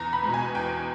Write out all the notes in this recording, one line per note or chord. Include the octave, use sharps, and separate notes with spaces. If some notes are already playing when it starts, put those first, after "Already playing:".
Already playing: E2 A#5
B5
B2 G#3
G#5
E2 G5